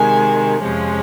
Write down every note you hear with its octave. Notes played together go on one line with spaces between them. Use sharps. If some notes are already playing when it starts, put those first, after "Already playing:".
Already playing: C3 D#3 G#3 G#5
F2 C3 F3 G#3 C#4